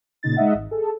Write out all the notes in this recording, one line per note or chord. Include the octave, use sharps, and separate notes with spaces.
A#2 C#3 D#4 A6
G#3 D#4 D#5 E5 F#5
G#1
G#4 A4